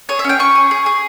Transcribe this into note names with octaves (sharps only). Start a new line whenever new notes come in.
G#4 C#5
E5
C#4 G5
C#4 C#6
G#4
G#4
G#4